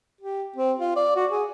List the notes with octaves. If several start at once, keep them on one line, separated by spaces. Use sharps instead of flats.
G4
C4
F4
D5
F#4
G#4